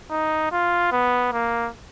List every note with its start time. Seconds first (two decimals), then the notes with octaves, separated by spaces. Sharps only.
0.11 D#4
0.52 F4
0.92 B3
1.33 A#3